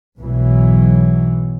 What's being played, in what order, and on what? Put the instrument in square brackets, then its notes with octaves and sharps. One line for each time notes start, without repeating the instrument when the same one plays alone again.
[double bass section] B1 G#2 B2 E3 F#3